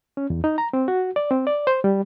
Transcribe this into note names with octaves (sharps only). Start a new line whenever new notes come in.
C#4
E2
D#4
A#5
C4
F#4
D5
C4
D5
C5
G3